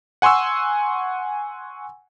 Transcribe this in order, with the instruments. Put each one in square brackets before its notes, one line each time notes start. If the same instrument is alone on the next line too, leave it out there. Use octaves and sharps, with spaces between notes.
[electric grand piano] F#5 G#5 C6 C#6 E6